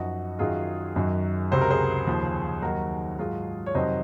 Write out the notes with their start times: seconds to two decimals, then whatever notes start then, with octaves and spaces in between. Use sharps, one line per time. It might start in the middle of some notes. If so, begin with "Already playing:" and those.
Already playing: F#2 F3 D#4 F#4
0.39 F#2 D#3 F#3 F4 G#4
0.96 F#2 D#3 F#3
1.51 C#2 C3 F#3 C5
1.61 A#4
1.71 G#4 C5
2.07 D#2 C#3 F3
2.62 D#2 D#3 F#3 F#4 A#4
3.19 G#2 F#3 F4 G#4
3.66 C#5
3.75 F2 C3 D#3 F#3 C5 D#5